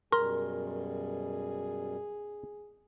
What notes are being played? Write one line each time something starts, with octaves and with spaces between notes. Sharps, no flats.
F#2 B2 G3 G#4 A#4 C6